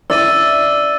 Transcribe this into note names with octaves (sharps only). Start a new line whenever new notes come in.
D5 E5 E6 A6 D#7